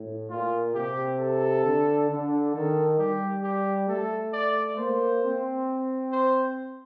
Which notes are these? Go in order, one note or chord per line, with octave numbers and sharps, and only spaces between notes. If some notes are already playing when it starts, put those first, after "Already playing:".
Already playing: A2
A#2 F4
C3 G4
A4
D3
D3
D#3 A4
G3 G4
G4
A3 A4
D5
A#3 C5
C4
C5